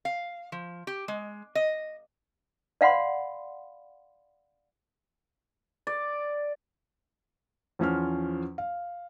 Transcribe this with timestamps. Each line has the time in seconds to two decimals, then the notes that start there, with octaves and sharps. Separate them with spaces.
0.05 F5
0.52 F3
0.87 G4
1.08 G#3
1.55 D#5
2.81 D5 F5 F#5 B5 C6
5.87 D5
7.79 E2 F3 C#4 C5 F6
8.58 F5